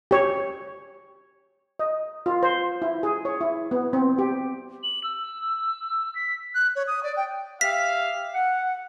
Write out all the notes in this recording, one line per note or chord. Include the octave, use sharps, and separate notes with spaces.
G4 C#5
D#5
F4
C5
E4
G#4
C#5
E4
B3
C4
G4
F#7
E6
B6
F#6
C#5
D#6
D5
G5
G4 E5 F5 B6
F#5